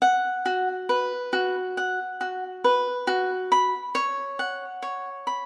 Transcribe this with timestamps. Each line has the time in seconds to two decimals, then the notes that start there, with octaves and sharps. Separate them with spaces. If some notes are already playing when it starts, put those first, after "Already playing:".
0.02 F#5
0.46 F#4
0.89 B4
1.33 F#4
1.77 F#5
2.21 F#4
2.64 B4
3.07 F#4
3.52 B5
3.95 C#5
4.39 F#5
4.83 C#5
5.27 B5